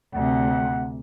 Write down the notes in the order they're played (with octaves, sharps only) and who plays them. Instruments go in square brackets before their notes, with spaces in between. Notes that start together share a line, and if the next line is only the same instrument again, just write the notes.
[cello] D2 C3 [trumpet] F#5